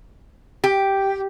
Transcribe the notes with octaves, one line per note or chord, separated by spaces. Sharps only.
G4